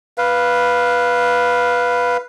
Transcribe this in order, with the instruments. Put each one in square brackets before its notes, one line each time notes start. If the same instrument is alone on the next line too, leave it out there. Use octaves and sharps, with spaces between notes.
[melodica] B4 F5